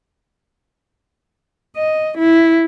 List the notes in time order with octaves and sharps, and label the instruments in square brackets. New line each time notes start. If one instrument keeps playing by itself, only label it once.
[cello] D#5
E4